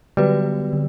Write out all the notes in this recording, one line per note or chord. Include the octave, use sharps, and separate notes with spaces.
D3 F#3 G3 B3 F#4 B4
D3